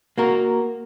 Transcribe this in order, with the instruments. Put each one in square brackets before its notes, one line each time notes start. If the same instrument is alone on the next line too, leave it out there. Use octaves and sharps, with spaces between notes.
[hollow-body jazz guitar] A#3 F#4 A#4